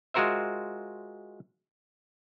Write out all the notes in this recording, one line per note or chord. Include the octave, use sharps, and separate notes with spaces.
G#3 F4 F#4 A#4 C5 E5